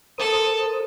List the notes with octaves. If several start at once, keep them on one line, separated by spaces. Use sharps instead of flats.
A4 A#4 C5 D#6